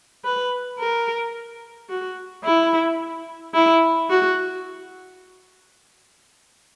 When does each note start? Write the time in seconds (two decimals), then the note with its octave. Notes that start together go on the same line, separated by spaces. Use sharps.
0.25 B4
0.79 A#4
1.90 F#4
2.44 E4
3.54 E4
4.10 F#4